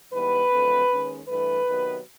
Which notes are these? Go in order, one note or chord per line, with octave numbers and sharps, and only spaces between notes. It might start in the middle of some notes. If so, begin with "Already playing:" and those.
G#2 E3 G3 B3 B4
F2 D3 F#3 A3 C4
D#2 D#3 G#3 C#4
G2 E3 A3 B4
C3 D#3 F#3 B3